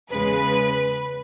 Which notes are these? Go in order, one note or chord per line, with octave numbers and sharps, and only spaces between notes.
E2 C#3 G#3 B4